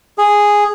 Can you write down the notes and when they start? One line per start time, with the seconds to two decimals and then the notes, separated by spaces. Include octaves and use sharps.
0.18 G#4